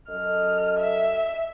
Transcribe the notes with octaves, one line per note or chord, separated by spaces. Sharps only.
F#2 A4 D#5 F6
E5